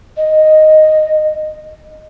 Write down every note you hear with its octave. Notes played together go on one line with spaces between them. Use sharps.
D#5